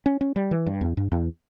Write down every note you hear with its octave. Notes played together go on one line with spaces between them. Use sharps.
C#4
C#4
G3
E3
G2
E2
G2
E2